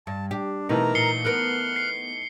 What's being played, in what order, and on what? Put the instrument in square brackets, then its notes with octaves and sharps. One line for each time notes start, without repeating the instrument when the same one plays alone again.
[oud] G2 [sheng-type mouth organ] A5
[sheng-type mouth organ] D4 [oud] G4
[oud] B2 [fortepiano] E3 A3 D#4 [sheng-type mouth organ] A#4 A#5
[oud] A#2 [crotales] C7 C#7 G7
[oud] B3 A#4 [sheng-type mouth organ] F6 F#6
[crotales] C7